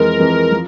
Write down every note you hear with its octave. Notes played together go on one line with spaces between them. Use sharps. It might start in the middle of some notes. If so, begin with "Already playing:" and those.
Already playing: F2 E3 G#3 A#4
F2 E3 G#3
F3